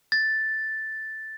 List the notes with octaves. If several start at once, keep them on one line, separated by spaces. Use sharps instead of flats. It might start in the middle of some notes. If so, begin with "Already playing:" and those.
A6